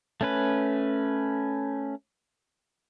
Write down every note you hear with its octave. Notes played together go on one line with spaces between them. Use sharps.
A3 C#4 B4